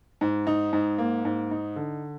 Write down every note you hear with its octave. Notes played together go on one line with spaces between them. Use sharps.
G#2
D#4
G#2
A#3
G#2
D#4
D3